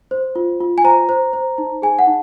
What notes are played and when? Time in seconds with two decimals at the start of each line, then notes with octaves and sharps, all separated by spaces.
0.11 C5
0.35 F4
0.60 F4
0.78 G#5
0.84 C5 A#5
1.09 C5
1.33 C5
1.58 D#4
1.82 G#4 G#5
1.99 F#5
2.07 D#4